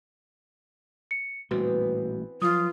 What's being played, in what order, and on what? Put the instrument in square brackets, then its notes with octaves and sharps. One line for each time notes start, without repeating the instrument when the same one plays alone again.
[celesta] C#7
[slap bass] A1 A#2 G3 [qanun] E3 B3 C4 [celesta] F#4
[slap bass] F3 F#3 [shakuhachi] F4 [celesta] D#6